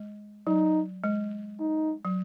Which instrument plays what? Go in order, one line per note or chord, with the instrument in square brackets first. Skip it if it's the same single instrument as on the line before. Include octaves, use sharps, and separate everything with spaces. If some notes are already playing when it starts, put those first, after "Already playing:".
Already playing: [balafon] G#3
[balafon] F#3 [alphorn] D#4
[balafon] G#3
[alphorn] D#4
[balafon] F#3